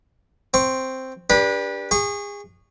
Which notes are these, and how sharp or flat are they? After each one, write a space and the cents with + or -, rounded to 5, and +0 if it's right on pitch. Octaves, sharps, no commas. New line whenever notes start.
C4 +0 C#6 +0
D4 -5 G4 +30 B4 -25
G#4 -30 C#6 +0